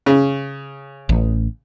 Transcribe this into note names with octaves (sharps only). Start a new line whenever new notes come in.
C#3
A1